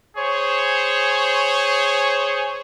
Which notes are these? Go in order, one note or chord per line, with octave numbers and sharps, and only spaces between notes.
G#4 C5 C#5